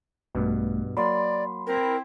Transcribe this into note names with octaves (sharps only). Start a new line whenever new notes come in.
A#1 G2 B2 A3
F#3 A#3 D5 B5 C6
C4 E4 A#4